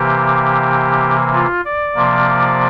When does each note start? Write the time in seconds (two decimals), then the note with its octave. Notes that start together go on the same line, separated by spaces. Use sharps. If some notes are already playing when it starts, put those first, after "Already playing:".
Already playing: C3 E3 A#3 G4
1.33 F4
1.65 D5
1.95 C3 F3 A#3